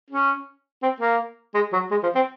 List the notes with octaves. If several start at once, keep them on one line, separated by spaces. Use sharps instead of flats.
C#4
C4
A#3
G#3
F#3
G#3
F3
C4